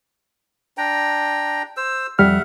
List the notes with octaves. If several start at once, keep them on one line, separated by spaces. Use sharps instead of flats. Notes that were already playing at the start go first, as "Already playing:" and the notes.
D4 G5 A#5
C5 E6
F2 G3 E5 F#5 F6